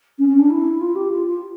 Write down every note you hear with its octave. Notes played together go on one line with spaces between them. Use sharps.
C#4
C#4
D4
E4
F4
G4
F4
F4